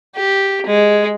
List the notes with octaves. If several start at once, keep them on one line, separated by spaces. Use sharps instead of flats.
G4
G#3